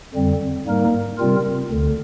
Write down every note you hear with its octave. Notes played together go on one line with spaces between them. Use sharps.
F2 D3 G3 C4
G#2 G3 A#3 D#4 A#4
C3 G3 C4 F4 A#4
D2 D3